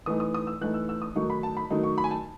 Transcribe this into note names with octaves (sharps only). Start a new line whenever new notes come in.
E3 A3 D#4 D#6
D#6
D#6
E6
E3 A3 D#4 F#6
E6
E6
D#6
D#3 F#3 A3 D#4 C#6
B5
A5
B5
D#3 F#3 A3 D#4
C#6
B5
G#5
A5